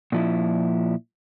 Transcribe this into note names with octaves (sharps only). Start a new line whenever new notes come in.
A#2 F3 E4